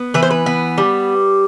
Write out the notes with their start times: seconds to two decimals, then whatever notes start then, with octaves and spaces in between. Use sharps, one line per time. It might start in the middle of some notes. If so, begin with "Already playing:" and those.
Already playing: B3
0.14 E3 B4
0.22 C5
0.30 B4
0.46 B3
0.78 G3